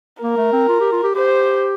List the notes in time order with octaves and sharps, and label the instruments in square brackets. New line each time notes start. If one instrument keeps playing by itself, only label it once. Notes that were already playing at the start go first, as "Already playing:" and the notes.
[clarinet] A#3 [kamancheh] A#4
[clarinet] A3
C4
F4
G4
F4
G4
[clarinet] G4 [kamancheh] C5